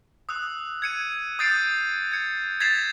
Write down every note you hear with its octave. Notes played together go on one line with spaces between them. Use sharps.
D#6 E6 F#6 F7
G#6 C#7 D#7
D#6 G6 A6 C7 D7 D#7
G#6 C#7
G#6 A6 B6 C7 E7 F7